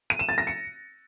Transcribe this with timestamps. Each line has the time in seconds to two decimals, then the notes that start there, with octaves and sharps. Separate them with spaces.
0.10 D#7
0.19 E7
0.29 A6
0.38 A#6
0.47 C#7